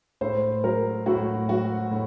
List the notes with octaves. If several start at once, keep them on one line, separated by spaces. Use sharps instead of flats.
A2 C5
F#3 A#4
A2 F#4
F#3 F#4
A2